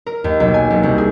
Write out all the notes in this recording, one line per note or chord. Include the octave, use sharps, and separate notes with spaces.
A#4
D#2
B1
G#5
B1
C2
G#4